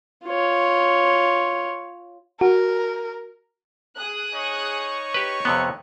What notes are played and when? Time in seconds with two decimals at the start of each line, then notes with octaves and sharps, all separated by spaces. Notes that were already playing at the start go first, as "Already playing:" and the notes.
0.25 F4 C#5
2.41 F#4 A#4
3.99 G#4 D#6 F#6
4.34 D#4 C#5 C#6
5.14 G4 B4
5.45 F2 C3 B3